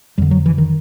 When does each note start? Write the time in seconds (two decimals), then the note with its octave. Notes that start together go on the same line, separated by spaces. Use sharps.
0.18 F2 D3 G3
0.31 F#3
0.46 E3
0.58 D#3